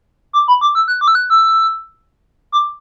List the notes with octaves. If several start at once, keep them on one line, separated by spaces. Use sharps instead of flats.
D6
B5
D6
E6
F#6
D6
E6
F#6
E6
D6